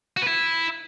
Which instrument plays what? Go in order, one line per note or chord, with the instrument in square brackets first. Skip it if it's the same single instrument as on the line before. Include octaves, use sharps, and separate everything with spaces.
[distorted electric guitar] F#4
B4
E4